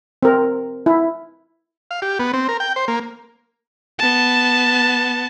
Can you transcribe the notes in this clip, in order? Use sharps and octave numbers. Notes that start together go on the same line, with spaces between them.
C4 A#4
E4
F5
G4
B3
C4
A#4
G5
C5
A#3
B3 A5